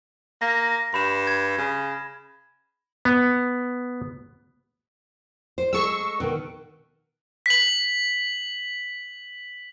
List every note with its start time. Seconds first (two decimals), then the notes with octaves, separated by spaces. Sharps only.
0.42 A#3 A#6
0.94 G2 B5 E7
1.27 G#6
1.58 C#3
3.05 B3
5.58 C5
5.73 G#3 A4 C#6 E6
6.20 B2 D#3
7.46 B6 F#7